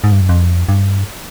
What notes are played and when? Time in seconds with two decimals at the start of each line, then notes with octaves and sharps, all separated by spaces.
0.04 G#2
0.12 G2
0.21 F#2
0.29 F2
0.69 G2